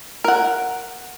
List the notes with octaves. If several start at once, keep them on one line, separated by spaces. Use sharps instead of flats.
A#4 F#5